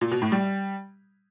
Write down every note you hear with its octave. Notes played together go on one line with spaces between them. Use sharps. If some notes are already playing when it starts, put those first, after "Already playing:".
A#2
B2
A2
G3